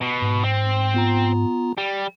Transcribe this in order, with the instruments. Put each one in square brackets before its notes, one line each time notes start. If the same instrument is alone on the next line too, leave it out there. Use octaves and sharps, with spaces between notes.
[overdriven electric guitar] B2
[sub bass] G#2
[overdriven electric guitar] C4
[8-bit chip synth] B3 F4 A#5
[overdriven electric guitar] G3